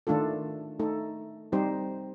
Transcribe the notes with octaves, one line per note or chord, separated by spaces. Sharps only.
D#3 A3 D4 F4 A4
A3 D#4 A4
G3 C4 D#4 G4 C5